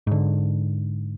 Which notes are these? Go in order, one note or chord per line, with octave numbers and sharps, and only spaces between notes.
G#2 D3